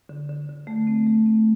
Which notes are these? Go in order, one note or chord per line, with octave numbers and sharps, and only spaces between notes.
D3
D3
D3
A3
C4
A3
C4